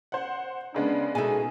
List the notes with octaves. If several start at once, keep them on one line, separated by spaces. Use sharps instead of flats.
C5 F#5
C#3 G#3 B3 D4
B2 D#4 G#4 A4 E5 G#5